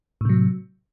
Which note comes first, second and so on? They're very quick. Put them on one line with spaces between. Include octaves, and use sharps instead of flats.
A2 C3 F#3